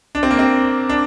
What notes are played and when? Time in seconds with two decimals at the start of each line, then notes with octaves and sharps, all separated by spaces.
0.15 D4
0.23 C4
0.31 A#3
0.39 C4
0.89 D4